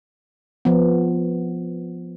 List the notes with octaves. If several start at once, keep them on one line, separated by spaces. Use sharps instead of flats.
F3 B3